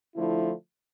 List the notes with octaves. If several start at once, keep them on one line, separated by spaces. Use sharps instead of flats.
D3 F3 A3 E4